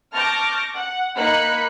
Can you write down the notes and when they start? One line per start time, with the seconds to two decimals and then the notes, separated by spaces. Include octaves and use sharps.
0.14 A5 C#6 D6 F6 G6 A#6
0.75 F#5
1.16 A#3 D#4 B5 F#6 C#7